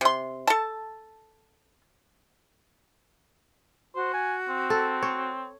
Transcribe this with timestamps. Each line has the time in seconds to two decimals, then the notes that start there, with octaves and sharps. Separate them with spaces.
0.01 C3 C6
0.47 A4 A5
3.95 F#4 C5
4.14 G#5
4.49 C4
4.70 A4
5.02 C#5